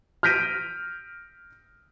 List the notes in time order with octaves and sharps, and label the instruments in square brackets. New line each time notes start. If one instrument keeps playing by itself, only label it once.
[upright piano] F6 G6 A#6 B6 D7 D#7